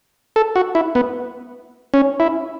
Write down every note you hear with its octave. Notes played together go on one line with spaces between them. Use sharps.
A4
F#4
E4
B3
C#4
E4